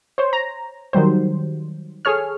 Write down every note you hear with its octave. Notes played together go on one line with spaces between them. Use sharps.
C5 C#5
A#5
D#3 F#3 G3 C5
G#4 A4 C#5 F6